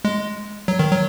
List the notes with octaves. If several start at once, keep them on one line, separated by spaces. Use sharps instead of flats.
G#3
F#3
D#3
F#3